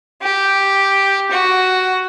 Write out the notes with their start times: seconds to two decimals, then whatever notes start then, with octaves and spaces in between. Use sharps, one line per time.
0.22 G4
1.31 F#4